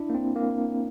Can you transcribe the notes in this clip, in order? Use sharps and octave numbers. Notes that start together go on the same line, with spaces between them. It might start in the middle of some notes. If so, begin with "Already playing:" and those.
Already playing: D4 E4
A#3
C4
A#3